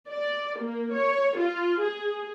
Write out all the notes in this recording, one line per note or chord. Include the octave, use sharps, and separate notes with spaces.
D5
A#3
C#5
F4
G#4